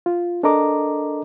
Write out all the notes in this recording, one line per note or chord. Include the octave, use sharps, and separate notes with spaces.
F4
D4 A4 A#4 D#5 A#5 D6